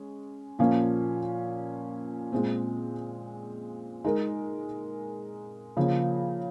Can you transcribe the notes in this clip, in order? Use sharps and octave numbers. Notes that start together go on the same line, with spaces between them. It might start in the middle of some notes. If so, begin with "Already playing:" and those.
Already playing: G#3 C#4
A#2 F3 A#3 C#4
A#2 G#3 C4
G#3 D#4 A#4
C#3 F3 A#3